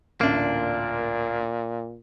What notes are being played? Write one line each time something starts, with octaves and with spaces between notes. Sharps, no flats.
A1 D2 A#2 A#3 D4